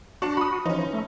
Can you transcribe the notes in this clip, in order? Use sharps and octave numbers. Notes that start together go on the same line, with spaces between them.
D4 F#4 A5
B5 D#6
E3 F3 C#4 D#4
A3